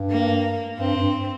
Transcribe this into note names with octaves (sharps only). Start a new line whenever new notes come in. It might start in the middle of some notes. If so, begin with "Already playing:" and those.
Already playing: G2
A#3
G2 C4
G2